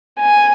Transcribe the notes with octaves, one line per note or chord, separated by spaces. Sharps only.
G#5